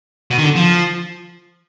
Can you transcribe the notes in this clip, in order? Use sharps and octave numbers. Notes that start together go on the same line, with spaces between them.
B2
D#3
D3
F3